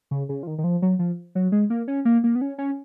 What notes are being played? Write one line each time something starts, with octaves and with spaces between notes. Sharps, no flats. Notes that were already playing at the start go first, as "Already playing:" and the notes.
C#3
C#3
F3
D#3
D#3
F3
F#3
F3
F#3
G#3
A#3
C#4
A#3
A#3
B3
C#4
C#4